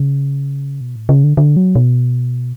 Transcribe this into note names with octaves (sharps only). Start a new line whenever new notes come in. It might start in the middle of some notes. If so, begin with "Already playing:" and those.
Already playing: C#3
B2
A2
C#3
D3
D3
F#3
B2